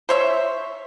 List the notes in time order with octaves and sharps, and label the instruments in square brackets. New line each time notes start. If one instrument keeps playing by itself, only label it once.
[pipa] C5 C#5 E5